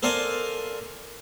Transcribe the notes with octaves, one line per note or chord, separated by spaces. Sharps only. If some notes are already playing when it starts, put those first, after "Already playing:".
A4 A#4 C5 D5 F5 G#5